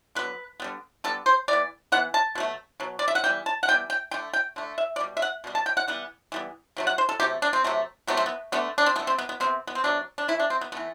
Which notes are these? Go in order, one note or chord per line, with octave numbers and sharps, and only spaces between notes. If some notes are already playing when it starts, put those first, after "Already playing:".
D3 F#3 B3 B4
D3 G3 B3
D3 G3 B3 A4
C5
E3 B3 D5
E3 B3 F#5
A5
B2 F#3 A3
B2 F#3
D5
E5
F#5
E3 G3 B3 G5
A5
F#5
E3 G3 B3 G5
G5
D3 A3 G5
G5
D3 A3
E5
D5
B2 G3
E5
F#5
B2 G3 B3
A5
G5
F#5
E3 G3 B3 F#5
E3 G3 B3
C3 F#3 A3
F#5
C5
A4
C3 F#3 A3 G4
D4
C4
C3 F#3 A3
C3 F#3 A3 B3
C4
B3
D3 A3 B3
D4
C4
D3 A3 B3
C4
B3
B3
C3 F#3 B3 C4
B3
C4
C3 F#3 B3 D4
D4
E3 A3 E4
D4
C4
B3
E3 A3 B3